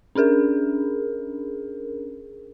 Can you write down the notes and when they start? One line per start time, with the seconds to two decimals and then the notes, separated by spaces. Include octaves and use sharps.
0.15 C#4 D4 G#4 A#4